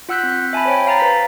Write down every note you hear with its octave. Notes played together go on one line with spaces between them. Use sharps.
F4 F#5 E6 F#6 G6 B6
C4
E5 G#5 A5 B5
C5 C#5 G5
F5 A#5 A6
B4 C5 F5 B6